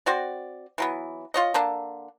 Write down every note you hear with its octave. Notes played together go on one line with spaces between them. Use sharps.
C4 F#4 D5
E3 F#3 B3
F4 C#5 D#5
D3 A#3 D4